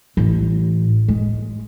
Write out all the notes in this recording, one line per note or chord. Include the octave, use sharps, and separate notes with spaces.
A1
G#3